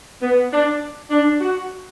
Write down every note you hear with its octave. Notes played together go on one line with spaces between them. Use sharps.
B3
D4
D4
F#4